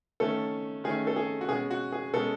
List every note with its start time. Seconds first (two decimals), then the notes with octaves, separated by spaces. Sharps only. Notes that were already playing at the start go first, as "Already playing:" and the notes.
0.20 D#3 A3 C#4 A4
0.84 D#3 A3 C#4 G#4
1.07 A4
1.16 G#4
1.41 F#4
1.49 B2 G#3 C#4 G#4
1.71 F#4
1.92 G#4
2.13 B2 G#3 C#4 A4